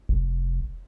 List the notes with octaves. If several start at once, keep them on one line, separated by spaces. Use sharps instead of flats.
F1